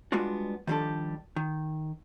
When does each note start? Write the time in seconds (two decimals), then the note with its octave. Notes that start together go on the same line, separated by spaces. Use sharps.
0.12 G3 G#3 B3 D4 F4 F#4
0.67 D#3 F3 G3 D4 G4 A4
1.36 D#3